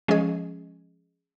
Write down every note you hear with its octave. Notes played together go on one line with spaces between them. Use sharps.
F3 G#3 C#4 G#4 D#5